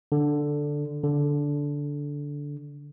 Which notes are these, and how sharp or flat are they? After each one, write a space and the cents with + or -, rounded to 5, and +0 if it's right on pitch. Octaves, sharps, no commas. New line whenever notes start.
D3 +0
D3 -15